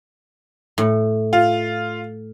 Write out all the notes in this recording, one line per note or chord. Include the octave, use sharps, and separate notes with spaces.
A2
F4